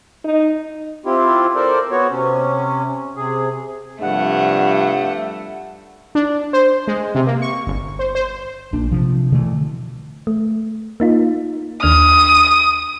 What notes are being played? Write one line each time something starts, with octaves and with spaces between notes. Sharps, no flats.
D#4
C4 E4 F4 G4
A4 A#4 C5 D5
B3 F#4 C#5
C3 C#4
C3 G#4
G2 C3 F3 G3 A3 F#5
D4
C5
G#3
C3
A#3
C#6
G1
C5
C5
A#1 A#2 D4
C3 F3
B2 D3 E3 A3
A3
A#3 D#4 F4
D#2 D4 D#6 F6